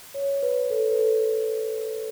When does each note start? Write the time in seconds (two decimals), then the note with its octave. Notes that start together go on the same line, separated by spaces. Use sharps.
0.14 C#5
0.43 B4
0.70 A4
0.92 B4
0.99 A4